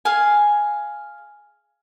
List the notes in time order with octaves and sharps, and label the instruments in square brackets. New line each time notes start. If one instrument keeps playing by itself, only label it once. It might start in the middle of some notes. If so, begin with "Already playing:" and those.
[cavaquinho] G#4 F5 G#5